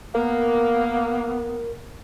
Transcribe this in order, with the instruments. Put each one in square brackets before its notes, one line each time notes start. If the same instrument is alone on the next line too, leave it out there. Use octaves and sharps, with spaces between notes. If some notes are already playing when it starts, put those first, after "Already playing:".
[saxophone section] A#3 [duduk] B3 [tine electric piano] A#4